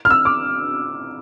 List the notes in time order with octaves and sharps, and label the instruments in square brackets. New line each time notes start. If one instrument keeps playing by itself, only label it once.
[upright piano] F6
E6
D6